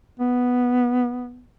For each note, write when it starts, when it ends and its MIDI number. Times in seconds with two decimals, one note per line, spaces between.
0.20 1.43 59